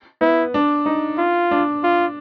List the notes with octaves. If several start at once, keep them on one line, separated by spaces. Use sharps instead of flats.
B3 E4
D4
D#4
F4
D4
F4